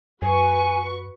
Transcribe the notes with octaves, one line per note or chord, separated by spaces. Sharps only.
F#2 F#4 B4 G#5 C#6